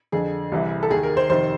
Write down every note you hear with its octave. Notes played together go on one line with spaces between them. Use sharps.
F2 D3 G#4
C2 C3 E3
A4
D#2 D#3 G#4
A#4
C5
F2 C3 D#3 C5